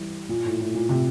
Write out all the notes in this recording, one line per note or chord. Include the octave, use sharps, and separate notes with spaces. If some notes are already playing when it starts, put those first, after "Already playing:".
Already playing: E3 G3
A#2
A2
A2
A#2
C3